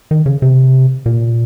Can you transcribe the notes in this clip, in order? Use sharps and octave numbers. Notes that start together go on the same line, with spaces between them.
D#3
C#3
C3
A#2